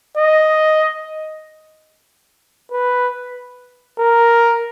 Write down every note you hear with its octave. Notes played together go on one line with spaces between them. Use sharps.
D#5
B4
A#4